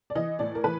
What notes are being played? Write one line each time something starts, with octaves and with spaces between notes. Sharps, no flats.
D5
E3 D#5
A2 D5
A#4
E3 B4